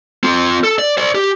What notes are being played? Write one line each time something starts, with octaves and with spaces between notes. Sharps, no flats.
C4 F4
A4
D5
C5 D5
G4